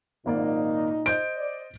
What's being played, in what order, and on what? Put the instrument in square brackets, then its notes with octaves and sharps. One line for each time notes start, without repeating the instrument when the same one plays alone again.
[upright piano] G#1 A#3 D5 [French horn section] A#2 D#4
[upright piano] C5 D#5 [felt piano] G6 D7
[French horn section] D5